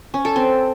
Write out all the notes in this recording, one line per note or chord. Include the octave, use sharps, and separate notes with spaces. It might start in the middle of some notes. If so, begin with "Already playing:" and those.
C#4
A4
C4